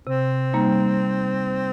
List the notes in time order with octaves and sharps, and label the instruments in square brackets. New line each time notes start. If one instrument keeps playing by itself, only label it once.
[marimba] C3 [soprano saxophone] C4
[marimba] G3 A#3 D#4